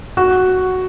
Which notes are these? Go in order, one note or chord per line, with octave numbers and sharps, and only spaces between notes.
F#4